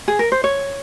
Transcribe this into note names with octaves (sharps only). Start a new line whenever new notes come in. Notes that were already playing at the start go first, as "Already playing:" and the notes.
G#4
A#4
C5
C#5